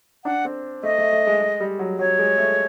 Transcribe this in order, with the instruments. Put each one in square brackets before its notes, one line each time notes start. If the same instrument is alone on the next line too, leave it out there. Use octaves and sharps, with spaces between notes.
[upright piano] D4 [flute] F#5
[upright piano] C4
[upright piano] A3 [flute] D#5
[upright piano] A3
A3
G#3
G#3
G3
F#3
[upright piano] F#3 [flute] C#5
[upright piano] G#3
A3